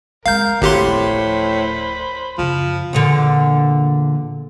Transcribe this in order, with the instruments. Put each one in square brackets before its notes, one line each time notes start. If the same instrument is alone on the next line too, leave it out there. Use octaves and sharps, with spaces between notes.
[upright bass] G#3 C4 [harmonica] A#4 [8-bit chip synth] F5 G6
[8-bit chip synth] G#1 G4 C6 [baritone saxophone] A2 [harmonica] A#3 F#5 [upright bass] B3
[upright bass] D1 F3 [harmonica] C5 B5
[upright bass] F#2 C#3 [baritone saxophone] F3
[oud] E2 A#2 D3